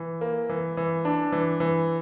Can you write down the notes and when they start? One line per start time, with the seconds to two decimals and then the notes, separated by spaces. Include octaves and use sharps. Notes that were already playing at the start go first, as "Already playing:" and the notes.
Already playing: E3
0.21 A#3
0.50 E3
0.77 E3
1.05 D4
1.32 E3
1.60 E3